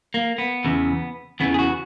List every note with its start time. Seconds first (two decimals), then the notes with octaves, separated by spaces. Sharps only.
0.14 A#3
0.38 B3
0.65 E2 C#3 E3
1.40 E2 C#3 E3 B3
1.54 G#4
1.59 F#4